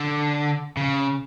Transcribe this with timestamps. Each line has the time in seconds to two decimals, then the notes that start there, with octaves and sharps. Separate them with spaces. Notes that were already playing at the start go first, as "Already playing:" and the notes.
Already playing: D3
0.77 C#3